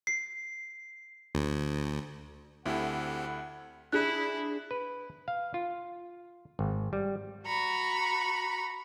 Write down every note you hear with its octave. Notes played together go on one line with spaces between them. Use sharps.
C7
D2
D2 C4 E4 G4 A4 F#5
D4 E4 G#4 F#6
B4
F5
F4
G#1
G3
F#4 A#5 B5 C#6